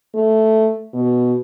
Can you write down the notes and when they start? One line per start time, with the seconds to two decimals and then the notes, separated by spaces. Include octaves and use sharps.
0.14 A3
0.93 B2